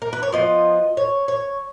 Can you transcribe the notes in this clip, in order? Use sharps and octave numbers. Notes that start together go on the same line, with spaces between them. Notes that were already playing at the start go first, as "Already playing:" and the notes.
A#4
B4
C#5
F3 B3 F4 D#5
C#5
C#5